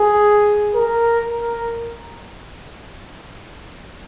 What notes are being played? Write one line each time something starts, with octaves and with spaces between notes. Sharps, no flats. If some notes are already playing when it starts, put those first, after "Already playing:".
Already playing: G#4
A#4
A#4